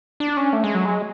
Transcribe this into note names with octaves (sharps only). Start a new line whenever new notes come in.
D4
C#4
A3
G#3
F#3
G#3